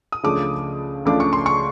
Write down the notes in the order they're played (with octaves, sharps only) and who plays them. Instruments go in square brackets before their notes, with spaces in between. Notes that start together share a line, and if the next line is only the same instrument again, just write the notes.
[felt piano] D#6
C#2 C#3 F3 A3 D4 D6
C#2 C#3 F3 A3 D4 D6
C#6
C6
C#6